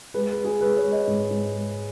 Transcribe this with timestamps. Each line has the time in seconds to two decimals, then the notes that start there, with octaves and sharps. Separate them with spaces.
0.14 G#3 B4
0.30 B4
0.37 G#3
0.45 G#4
0.61 G#3 B4
0.76 C#5
0.84 G#3
0.92 D#5
1.07 G#2
1.31 G#2
1.54 G#3